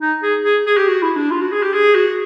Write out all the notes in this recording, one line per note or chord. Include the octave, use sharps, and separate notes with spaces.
D#4
G#4
G#4
G#4
G4
F#4
E4
D4
F4
F#4
G#4
G4
G#4
F#4